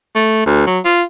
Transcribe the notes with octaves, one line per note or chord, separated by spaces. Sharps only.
A3
D2
F#3
F4